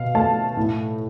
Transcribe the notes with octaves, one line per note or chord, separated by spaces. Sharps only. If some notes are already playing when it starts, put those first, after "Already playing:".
Already playing: B2 F5
A3 A5
A2